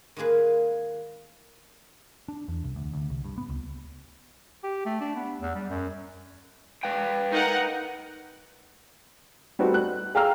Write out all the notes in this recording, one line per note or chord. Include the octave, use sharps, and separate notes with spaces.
D#3 G#3 A#3 G#4 B4
D4
E2
C2
D2
D2
C2
G2
B3
C#2
G4
A3
D4
B3
E2
G3
F#2
B4 F5 G5
D#4 A#4 F#5
G3 A3 B3 C4 D#4 F#4
F#6
G#4 F5 G5 A#5 E6 F6